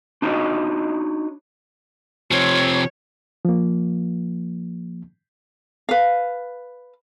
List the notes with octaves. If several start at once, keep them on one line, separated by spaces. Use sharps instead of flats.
D4 D#4 F#4 C#5 D#5
C3 F3 C#5
F3 A#3
B4 F5